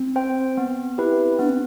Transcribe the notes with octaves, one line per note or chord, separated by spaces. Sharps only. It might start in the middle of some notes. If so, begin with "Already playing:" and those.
Already playing: C4
C5 G5
B3
E4 G4 B4
B3 D4
C4